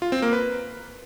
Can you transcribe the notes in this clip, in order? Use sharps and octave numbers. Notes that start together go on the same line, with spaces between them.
F4
C4
A#3
B4